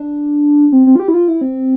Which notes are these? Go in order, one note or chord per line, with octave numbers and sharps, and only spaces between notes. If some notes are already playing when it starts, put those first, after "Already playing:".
Already playing: D4
C4
C4
F4
G4
E4
F4
E4
C4